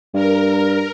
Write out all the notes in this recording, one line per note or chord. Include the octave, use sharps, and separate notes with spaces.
G2 A#4